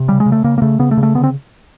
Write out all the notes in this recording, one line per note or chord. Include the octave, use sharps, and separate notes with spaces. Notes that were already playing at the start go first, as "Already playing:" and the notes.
Already playing: C3
C#3 G3
G#3
C#3
A3
C#3 A#3
A#3
C#3 A3
C#3 B3
A3
C#3
A3
D3 B3
C4